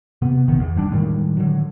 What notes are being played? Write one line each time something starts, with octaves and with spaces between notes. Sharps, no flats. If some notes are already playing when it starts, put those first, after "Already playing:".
C3 B3
A#1 D#3 B3
E2
F1 G3 D4
A2 D#3 G3 G#3
D3 F#3